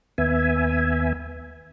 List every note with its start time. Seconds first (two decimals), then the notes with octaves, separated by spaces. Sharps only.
0.18 D#2 B3 E5 G#5